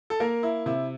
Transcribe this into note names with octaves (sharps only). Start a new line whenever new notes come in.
A4
A#3 A#4
E4
C3 E4